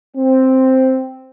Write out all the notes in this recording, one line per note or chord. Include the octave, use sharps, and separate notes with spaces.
C4